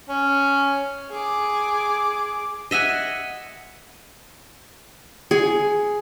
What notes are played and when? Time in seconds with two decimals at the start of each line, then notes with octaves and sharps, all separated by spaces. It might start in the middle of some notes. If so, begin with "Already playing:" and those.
0.09 C#4
1.11 G#4 D6
2.71 D#5 E5 F#5 G#5
5.31 G#4